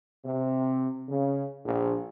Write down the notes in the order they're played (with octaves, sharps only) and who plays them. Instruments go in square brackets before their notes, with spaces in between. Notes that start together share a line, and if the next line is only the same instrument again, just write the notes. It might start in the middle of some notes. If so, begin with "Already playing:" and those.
[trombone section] C3
C#3
A#1